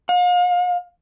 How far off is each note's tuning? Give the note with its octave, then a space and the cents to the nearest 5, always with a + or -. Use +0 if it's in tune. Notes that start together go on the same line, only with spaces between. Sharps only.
F5 +40